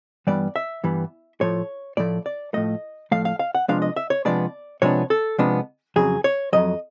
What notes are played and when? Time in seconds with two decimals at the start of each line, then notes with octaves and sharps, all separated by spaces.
0.27 G2 E3 G3 B3 D5
0.56 E5
0.84 G2 E3 G3 B3
1.41 A2 F3 A3 C#5
1.97 A2 F3 A3 D5
2.26 D5
2.54 A2 F3 A3 D#5
3.12 A2 F3 A3 F5
3.25 F5
3.39 F5
3.55 F#5
3.68 C3 F3 G#3 B3 D4 F5
3.82 D#5
3.96 E5
4.10 C#5
4.25 C3 F3 G#3 B3 D4 D5
4.82 C3 F3 G#3 B3 D4 C#5
5.10 A4
5.38 C3 F3 G#3 B3 D4
5.96 F2 C#3 F#3 G#4
6.24 C#5
6.53 F2 C#3 F#3 D#5